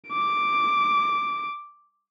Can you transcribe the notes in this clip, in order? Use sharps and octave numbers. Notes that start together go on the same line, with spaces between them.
D6 D7